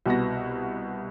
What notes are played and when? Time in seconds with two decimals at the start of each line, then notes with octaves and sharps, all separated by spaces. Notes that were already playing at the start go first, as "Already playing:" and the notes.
0.06 C2 B2 B3 F#4 A#6